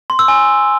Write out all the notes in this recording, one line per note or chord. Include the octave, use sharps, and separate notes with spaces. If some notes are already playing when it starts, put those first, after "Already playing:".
C6
E6
G#5